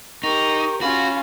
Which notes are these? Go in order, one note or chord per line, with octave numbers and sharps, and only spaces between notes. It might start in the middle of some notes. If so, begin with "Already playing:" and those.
D#4 G4 A#4 C#6
C#4 F4 F#4 F5 B5